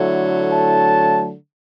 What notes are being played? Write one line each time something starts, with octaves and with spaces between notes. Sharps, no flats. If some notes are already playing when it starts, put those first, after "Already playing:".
Already playing: D3 F#3 A3 E4
A5